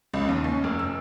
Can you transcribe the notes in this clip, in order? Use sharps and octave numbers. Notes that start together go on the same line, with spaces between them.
C#2
D#2
C#4
F1
E6